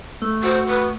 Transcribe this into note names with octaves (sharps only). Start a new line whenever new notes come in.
A3
F#4 C5
B4